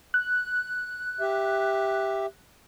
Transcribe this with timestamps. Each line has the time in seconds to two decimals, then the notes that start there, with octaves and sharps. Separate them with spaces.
0.14 F#6
1.20 G4 E5